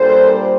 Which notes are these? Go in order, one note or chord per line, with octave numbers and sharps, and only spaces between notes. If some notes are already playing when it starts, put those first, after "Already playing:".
Already playing: A#2 G3 D4 A4 C5